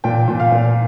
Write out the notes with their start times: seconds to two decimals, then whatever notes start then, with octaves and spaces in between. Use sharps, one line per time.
0.04 A#2 G5
0.28 A#2
0.40 F5
0.52 A#2